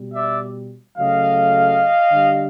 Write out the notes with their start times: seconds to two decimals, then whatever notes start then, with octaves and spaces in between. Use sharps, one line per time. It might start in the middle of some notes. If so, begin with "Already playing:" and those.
Already playing: B2 G3
0.13 D5 E5
0.98 C#3 F#3 A3 D#5 F5
2.11 D3 G3